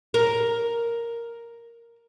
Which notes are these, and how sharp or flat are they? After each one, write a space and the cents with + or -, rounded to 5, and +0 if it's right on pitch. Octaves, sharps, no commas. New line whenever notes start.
A#4 +0